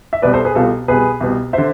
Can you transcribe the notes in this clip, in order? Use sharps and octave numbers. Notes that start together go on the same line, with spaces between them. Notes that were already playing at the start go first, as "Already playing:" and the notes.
E5
C2 B2 B4 D5
A4 C5
G#4 B4
C2 B2 F4 A4
C2 B2 G#4 B4
C2 B2
D3 C5 E5